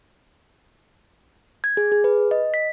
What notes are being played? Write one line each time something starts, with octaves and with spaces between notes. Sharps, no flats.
G#6
G#4
G#4
B4
D#5
B6